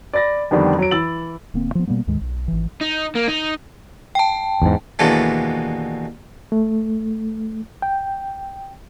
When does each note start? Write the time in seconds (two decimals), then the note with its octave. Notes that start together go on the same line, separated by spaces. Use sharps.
0.14 D5 B5 A6 A#6
0.51 F2 D3 D#3 G3 B3 D4
0.78 F#3 D7
0.91 E3 B5 E6 A6 F#7
1.54 D1 D2 A#3 C4
1.75 F3 B3
1.87 B2 G3 A#3 B3
2.07 D2 G#2 D#3 G#3
2.21 B1
2.48 G#1 E3
2.81 D#4
3.16 A#3
3.28 D#4
4.15 G5 A5
4.62 E2 G#2
4.99 D#2 B2 E3 G#3 A3 D4
6.52 A3
7.82 G5